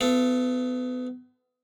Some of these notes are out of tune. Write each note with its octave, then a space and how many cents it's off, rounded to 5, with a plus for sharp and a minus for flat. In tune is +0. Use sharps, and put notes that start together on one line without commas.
B3 +30 F4 -40 A4 +0